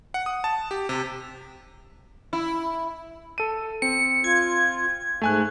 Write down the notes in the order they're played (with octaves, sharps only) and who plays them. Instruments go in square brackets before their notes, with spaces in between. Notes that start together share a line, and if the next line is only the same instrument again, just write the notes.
[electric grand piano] F#5
D#6
A5
G4
C3
[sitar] E4
[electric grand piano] A4 D#7
[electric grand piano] C4 [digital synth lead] C#7
[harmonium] F4 [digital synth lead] G#6
[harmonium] G#2 [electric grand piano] A3 G#5 F#6